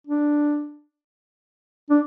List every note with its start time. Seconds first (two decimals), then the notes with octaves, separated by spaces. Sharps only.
0.07 D4
1.90 D4